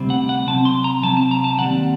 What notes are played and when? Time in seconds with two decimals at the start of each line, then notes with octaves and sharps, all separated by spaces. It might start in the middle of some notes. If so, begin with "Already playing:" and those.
Already playing: D2 C3 G3 C4
0.10 F#5
0.29 F#5
0.48 C3 F#3 C4 A5
0.65 C6
0.84 A#5
1.03 C3 F#3 C4 A5
1.17 A5
1.31 A#5
1.44 A5
1.58 D#2 D#3 G3 C4 F#5